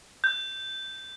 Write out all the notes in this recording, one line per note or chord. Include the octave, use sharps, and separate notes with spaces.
G6